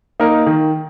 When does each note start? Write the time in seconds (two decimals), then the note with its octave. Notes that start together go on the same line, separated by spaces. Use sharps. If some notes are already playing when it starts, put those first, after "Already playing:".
0.20 A#3 D#4 A#4
0.46 D#3